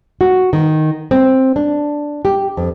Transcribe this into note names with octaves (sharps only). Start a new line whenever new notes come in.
F#4
D#3
C4
D4
G4
F2